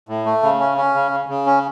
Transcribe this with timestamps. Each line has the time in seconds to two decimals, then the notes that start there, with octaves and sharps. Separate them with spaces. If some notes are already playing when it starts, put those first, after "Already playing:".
0.09 A2
0.25 A3
0.43 C#3
0.60 C#4
0.77 C#4
0.94 C#3
1.11 C#3
1.29 C#3
1.46 C#4